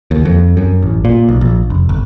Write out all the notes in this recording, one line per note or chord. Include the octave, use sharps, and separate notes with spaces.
D#2
F2
F#2
A1
A#2
B1
A#1
F1
G1